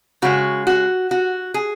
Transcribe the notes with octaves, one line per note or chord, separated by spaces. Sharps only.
C#3 G#3 F#4
F#4
F#4
G#4